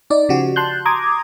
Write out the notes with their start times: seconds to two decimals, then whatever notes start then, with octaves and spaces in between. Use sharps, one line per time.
0.10 D#4 D5
0.29 C#3 F3 F#4 G4
0.56 A5 C6 F#6 G6
0.85 A#5 C6 D6 D#6 G#6